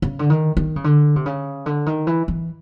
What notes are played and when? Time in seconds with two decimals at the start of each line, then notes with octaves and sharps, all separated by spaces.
0.02 C#3
0.19 D3
0.30 D#3
0.57 D#3
0.76 C#3
0.84 D3
1.16 C3
1.26 C#3
1.66 D3
1.86 D#3
2.07 E3
2.28 E3